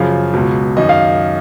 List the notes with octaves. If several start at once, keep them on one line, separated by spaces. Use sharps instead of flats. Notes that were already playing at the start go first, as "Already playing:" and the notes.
Already playing: F#2 C#3 F3 F5
C#2 B2
F#2 D#3 D#5
F5